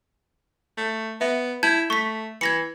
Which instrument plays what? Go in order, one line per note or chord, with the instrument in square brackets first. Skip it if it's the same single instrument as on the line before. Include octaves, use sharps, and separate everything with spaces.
[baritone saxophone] A3
[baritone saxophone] B3 [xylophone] E5
[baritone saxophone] E4 [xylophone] A5 G6 G#6
[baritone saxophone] A3 [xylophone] C#6 B6
[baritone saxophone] E3 [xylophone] G#6 A#6 C#7